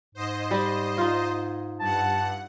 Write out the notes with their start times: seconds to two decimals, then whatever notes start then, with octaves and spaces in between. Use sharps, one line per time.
0.15 G#2 C5 D#5
0.51 G3
0.98 D#4 F4
1.80 G2 F#5 A5